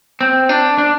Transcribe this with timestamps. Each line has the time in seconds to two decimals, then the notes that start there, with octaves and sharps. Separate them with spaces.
0.21 C4
0.49 D4
0.78 D4